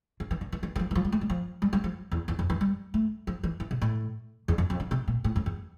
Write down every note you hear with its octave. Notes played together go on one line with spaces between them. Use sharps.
D3
E3
D3
E3
E3
E3
F3
E3
F3
G3
A3
G3
F3
G3
G3
F3
E2
E2
F2
E3
G3
A3
F3
E3
E3
C3
A2
E2
F2
F2
D3
C3
A#2
A2
F2
E2